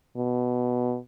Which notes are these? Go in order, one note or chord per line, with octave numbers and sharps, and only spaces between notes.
B2